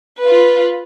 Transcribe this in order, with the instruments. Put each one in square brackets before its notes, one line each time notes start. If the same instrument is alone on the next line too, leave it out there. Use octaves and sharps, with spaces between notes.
[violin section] F4 B4